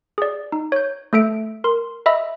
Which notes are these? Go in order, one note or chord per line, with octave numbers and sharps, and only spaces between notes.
G#4 D5
D#4
C#5 G6
A3 A4 E5 D7
A#4 C6
D#5 E5 B5 E6